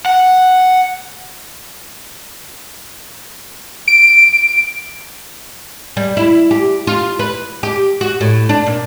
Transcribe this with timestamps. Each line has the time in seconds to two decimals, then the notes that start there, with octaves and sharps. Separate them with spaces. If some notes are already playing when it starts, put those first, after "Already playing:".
0.06 F#5
3.88 D7
5.97 G3
6.17 E4
6.51 G4
6.87 F4
7.19 B4
7.63 G4
8.01 F#4
8.21 A2
8.49 D4
8.67 A#2